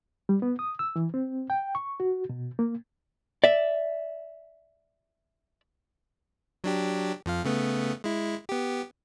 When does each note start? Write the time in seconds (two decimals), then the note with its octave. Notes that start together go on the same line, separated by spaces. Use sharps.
0.29 G3
0.42 B3
0.59 D#6
0.79 E6
0.96 E3
1.14 C4
1.50 G5
1.75 C#6
2.00 F#4
2.30 B2
2.59 A#3
3.44 D5 E5
6.64 F#3 D4 G4
7.26 F2 F3 F5
7.44 C#3 A3 B3
8.04 G#3 E4
8.49 B3 G4